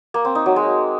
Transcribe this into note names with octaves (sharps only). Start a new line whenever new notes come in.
A#3
C4
D#4
F#3
G#3